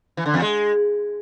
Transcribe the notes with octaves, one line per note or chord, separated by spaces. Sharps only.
E3
D3
E2
G#3